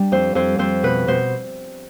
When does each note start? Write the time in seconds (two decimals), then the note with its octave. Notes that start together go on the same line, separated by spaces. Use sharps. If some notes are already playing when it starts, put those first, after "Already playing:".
Already playing: G3 D4
0.12 F2 C5
0.35 F2 C5
0.59 F2 C5
0.83 B2 B4
1.07 B2 C5